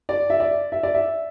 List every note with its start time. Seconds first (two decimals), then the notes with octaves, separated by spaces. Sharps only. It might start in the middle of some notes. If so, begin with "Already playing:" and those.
0.09 D5
0.30 E5
0.40 D5
0.72 E5
0.83 D5
0.94 E5